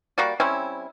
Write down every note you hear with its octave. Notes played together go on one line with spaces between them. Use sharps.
G3 A#3 F#4 D5
G3 C4 C#4 E4